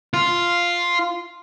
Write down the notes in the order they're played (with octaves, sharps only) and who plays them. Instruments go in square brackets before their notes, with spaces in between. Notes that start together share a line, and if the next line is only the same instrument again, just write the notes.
[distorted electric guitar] F4